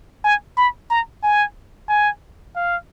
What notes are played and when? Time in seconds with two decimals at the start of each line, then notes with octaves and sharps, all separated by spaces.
0.24 G#5
0.57 B5
0.90 A#5
1.23 G#5
1.89 G#5
2.56 F5